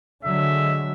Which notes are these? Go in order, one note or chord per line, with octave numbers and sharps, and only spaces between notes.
D3 F#3 G#3 E5